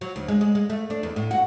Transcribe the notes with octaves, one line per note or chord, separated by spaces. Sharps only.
F#3
D2
G#3
G#3
G#3
A3
D4
E2
A2
F#4